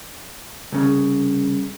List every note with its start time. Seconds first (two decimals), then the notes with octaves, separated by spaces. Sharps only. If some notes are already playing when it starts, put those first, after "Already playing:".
0.72 C2 C#3